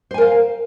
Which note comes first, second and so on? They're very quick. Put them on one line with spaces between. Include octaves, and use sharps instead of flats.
C5 G#5 A#4 F5